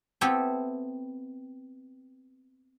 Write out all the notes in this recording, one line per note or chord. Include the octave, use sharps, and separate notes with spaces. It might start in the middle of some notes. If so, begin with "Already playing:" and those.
B3 C4 E4 G4 A4 G5